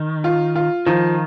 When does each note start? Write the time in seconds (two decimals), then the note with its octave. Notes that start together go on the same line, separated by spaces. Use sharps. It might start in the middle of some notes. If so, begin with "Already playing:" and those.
Already playing: D#3
0.24 F4
0.56 F4
0.86 D#3 F3